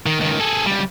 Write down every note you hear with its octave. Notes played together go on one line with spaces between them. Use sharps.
D#3
C#2 D#3
G#4 A4
C#2 G3